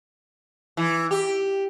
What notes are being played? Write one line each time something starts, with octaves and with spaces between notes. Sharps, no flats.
E3
G4